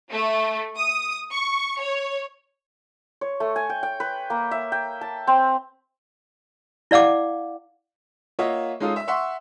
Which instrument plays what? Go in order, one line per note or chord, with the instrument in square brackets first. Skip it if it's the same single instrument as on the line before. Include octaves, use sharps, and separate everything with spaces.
[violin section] A3
D#6
C#6
C#5
[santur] C#5
A3
G#5
G5
G5
B4
A#3
E5
G5
A5
C4
[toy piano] E4 D5 F5 F#5 D6
[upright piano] A#3 F4 C#5 D#5 E5 F#5
G#3 C#4 D#4 F4 A4
E5 E6
E5 F#5 C6 C#6